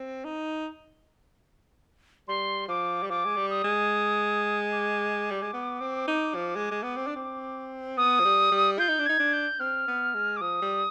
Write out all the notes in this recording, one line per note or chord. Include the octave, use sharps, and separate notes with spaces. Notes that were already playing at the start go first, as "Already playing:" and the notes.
Already playing: C4
D#4
G3 C6
F3 D6
G3
F3 D6
G#3
G3
D#6
G#3
D6
G3
G#3
B3
C4
D#4
F3
G#3
G#3
B3
C4
D4
C4
B3 D#6
F3
G3
G3
F4 G6
D#4
D4
D#4 G#6
D4
G6
C4 F6
B3
G#3
D6
F3 D#6
G3